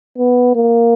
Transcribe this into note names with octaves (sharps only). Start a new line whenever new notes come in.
B3
A#3